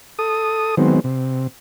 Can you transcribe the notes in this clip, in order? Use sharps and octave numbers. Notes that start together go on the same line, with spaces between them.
A4 D#6
D#3 F#3 G#3 B3 C4
C3